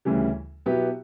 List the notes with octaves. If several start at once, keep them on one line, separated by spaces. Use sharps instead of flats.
D2 C#3 E3 G3
B2 F#3 B3 E4 G4